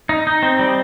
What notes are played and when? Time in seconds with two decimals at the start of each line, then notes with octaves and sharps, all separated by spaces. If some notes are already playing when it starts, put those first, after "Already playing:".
0.09 D#4
0.27 D#4
0.43 C4
0.59 G3